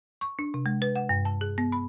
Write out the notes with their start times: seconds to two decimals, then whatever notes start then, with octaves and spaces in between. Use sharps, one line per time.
0.21 C#6
0.39 D4
0.54 C3
0.66 G#3
0.82 B4
0.96 F#5
1.09 G2
1.25 A5
1.41 G#4
1.58 B3
1.72 B5